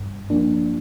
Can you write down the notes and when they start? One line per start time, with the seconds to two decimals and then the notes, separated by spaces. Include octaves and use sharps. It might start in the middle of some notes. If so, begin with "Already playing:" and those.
Already playing: G2
0.30 F3 A#3 D4